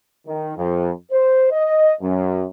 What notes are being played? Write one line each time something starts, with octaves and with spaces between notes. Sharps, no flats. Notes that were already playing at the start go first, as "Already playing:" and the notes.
D#3
F2
C5
D#5
F#2